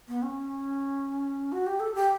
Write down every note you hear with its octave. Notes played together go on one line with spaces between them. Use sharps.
B3
C#4
F#4
G4
A4
G4